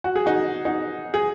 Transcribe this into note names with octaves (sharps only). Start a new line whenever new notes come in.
F#4
G#4
D#4 F#4
D#4 F#4
G#4